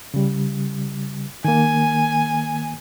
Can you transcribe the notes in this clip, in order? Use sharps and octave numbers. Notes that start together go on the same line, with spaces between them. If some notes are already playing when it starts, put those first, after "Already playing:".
C#3 G3
D#3 A#3 G#5